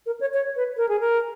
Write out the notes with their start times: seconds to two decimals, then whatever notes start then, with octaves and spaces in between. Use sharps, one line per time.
0.06 A#4
0.21 C#5
0.34 C#5
0.56 B4
0.77 A#4
0.89 G#4
1.00 A#4